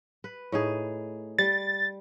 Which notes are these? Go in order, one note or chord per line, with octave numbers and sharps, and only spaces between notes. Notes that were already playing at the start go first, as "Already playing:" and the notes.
B4
A2 D#4 G#4
G3 A6